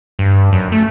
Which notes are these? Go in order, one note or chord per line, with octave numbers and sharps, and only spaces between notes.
G2
F#2
A3